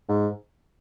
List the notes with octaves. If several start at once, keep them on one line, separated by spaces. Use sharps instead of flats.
G#2